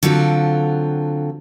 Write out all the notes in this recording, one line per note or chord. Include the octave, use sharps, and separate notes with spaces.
D3 F#3 C4 F4 A4